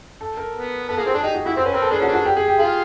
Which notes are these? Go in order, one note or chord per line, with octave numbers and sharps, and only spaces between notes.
A4
A#4
B3
B3 A4
A#3 G#4
C4 F#4
D4 G#4
D#4 G4
F#4
E4 F#4
C4 C5
C#4 B4
C4 A#4
A4
D4 G#4
C#4 F#4
D4
F#4
G4
G#4
G4
F4 G#4